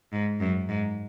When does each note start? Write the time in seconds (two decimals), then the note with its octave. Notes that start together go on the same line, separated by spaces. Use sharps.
0.13 G#2
0.40 F#2
0.69 G#2